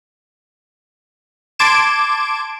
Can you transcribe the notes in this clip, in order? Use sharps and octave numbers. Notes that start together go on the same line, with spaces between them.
A5 C6 D6 G#6 D7 E7